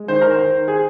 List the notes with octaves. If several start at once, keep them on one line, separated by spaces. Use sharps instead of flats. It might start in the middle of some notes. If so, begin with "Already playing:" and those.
Already playing: G#3
D#3 C5
A#4
C5
D#3
G#4